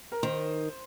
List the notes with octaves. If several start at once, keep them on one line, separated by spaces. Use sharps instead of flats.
A#4
D#3 C5